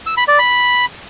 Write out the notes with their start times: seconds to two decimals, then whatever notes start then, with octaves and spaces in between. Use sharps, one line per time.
0.06 E6
0.17 B5
0.28 D5
0.39 B5